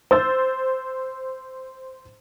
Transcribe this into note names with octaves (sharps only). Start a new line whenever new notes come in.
C5 E6 A6